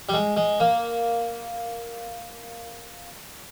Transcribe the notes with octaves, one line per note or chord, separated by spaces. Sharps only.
G3
G#3
G#3
A#3